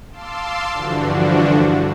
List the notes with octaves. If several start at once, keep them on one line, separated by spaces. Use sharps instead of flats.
F5 A5 C6 D6 E6
G2 D3 E3 F3 D4 F#4